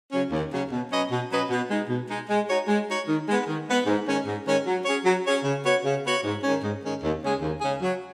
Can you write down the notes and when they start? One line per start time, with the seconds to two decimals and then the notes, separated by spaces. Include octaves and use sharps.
0.12 C#3 F#3 C#4
0.31 D#2
0.51 C#3 F#3 C#4
0.71 B2
0.90 F#3 C#4 B4 D#5
1.10 B2
1.30 F#3 C#4 B4 D#5
1.49 B2
1.70 G#3 D#4
1.89 B2
2.09 G#3 D#4
2.29 G#3
2.49 D#4 F#4 C#5
2.68 G#3
2.87 D#4 F#4 C#5
3.08 D#3
3.28 G#3 B3
3.47 D#3
3.67 G#3 B3
3.86 G#2
4.06 D#3 G#3 C#4
4.26 G#2
4.45 D#3 G#3 C#4
4.66 F#3
4.85 C#4 G#4 C#5
5.05 F#3
5.25 C#4 G#4 C#5
5.44 C#3
5.64 B3 F#4 C#5
5.84 C#3
6.03 B3 F#4 C#5
6.24 G#2
6.43 D#3 G#3 C#4
6.62 G#2
6.82 D#3 G#3 C#4
7.02 D#2
7.22 C#3 G#3 C#4 G#4
7.41 D#2
7.61 C#3 G#3 C#4 G#4
7.82 F#3